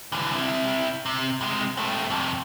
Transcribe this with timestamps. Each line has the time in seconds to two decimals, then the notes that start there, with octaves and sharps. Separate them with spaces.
0.12 D3 E3
0.32 C3 E4
1.06 C3
1.41 C3 G#3
1.77 A3 C4
2.10 F2 C3